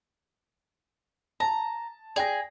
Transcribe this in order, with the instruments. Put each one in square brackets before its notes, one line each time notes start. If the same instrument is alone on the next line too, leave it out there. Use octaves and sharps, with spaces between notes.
[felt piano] A5 [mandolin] A#5
[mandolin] G#4 [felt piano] D5 G5 A#6